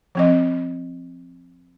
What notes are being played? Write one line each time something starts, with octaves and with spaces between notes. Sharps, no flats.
F3 C4 D#5